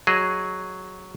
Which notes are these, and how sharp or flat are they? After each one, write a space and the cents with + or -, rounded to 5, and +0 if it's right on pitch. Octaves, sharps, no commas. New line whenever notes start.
F#3 +0 G#4 +0 D#5 -5